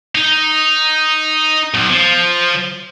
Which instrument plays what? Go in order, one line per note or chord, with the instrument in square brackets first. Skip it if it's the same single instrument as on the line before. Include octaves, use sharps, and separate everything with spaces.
[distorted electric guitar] D#4
B1
F3